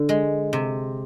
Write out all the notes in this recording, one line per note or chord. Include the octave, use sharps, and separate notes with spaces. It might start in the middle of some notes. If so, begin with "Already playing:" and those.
Already playing: D3
G#3
C3